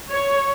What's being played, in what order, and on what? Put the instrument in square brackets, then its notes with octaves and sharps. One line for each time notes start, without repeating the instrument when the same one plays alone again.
[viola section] C#5